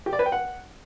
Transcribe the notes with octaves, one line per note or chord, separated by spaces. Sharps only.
G4
D5
B4
G5
F#5